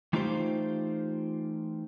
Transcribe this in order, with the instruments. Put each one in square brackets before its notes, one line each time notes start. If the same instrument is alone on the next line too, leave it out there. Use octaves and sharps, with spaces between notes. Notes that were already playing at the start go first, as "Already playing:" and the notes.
[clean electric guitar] E3 A3 D#4 F4 G4 C5